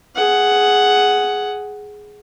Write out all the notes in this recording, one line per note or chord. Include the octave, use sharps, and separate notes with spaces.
G#4 F#5